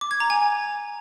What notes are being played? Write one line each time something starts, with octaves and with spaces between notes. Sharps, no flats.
D6
G#6
A#5
G#5